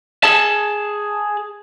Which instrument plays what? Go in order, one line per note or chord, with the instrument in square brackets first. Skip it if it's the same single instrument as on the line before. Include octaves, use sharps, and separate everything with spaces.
[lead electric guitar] G#4 A5